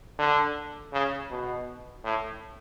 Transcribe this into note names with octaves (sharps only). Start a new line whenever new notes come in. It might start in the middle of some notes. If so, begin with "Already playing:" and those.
D3
C#3
B2
A2